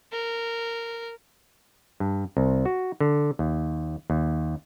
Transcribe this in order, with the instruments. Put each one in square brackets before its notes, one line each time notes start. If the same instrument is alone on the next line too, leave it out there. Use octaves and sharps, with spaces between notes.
[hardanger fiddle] A#4
[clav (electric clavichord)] G2
C2
F#4
D3
D#2
D#2